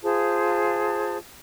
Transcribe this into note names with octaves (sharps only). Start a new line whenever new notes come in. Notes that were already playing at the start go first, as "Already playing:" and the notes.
F4 G#4 C5 A5